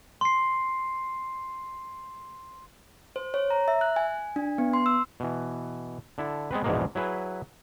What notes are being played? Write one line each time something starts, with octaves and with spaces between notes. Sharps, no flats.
C6 C7
C5
C#5
A#5
E5
F#6
G#5
D4
B3
C6
E6
B2 E3
D3 E4 A4
G#3 B3 C4 B4
A#1 E2 G#2 B2 G#3 A#3
F#3 E4 G#4 B4